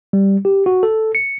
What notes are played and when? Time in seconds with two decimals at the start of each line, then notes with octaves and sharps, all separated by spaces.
0.13 G3
0.45 G4
0.66 F#4
0.83 A4
1.15 C#7